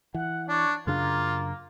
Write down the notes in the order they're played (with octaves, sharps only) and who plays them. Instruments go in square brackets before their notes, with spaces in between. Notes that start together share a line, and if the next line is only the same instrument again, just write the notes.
[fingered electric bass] E3 [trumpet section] F#5
[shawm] D4 [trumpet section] C#5 D5 C#6
[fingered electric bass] F#2 C#3 D4 [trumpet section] A#3 [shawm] F4